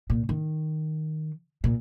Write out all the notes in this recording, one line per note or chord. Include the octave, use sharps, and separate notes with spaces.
A#2
D#3
A#2